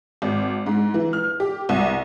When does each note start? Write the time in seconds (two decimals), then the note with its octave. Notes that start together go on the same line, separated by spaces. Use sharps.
0.22 G#1
0.66 G#2
0.94 E3
1.13 F6
1.40 G4
1.69 C2